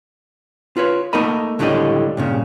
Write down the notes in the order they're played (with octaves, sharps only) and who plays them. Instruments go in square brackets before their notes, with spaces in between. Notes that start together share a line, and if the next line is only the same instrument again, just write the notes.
[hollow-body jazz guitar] F4 B4 C#5
A3 A#3 D#4 A#4 D#5 B5
C#2 A2 D3 G3 D4 D#5
G2 A#2 C#3